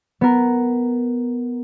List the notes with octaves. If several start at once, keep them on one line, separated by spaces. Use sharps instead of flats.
B3 A#4